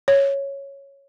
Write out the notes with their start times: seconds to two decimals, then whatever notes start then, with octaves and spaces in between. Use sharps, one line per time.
0.08 C#5